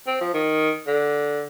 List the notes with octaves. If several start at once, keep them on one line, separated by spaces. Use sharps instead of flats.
C4
F3
D#3
D3